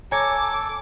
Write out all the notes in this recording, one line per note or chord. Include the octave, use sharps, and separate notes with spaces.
A4 C#5 G#5 A#5 D6 G#6